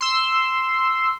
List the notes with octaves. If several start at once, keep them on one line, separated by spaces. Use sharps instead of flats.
C6 E6